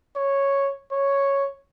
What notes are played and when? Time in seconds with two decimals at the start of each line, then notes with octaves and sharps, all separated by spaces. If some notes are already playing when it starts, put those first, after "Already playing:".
0.17 C#5
0.92 C#5